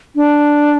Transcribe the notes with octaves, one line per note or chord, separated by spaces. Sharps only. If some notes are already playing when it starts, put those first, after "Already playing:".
D4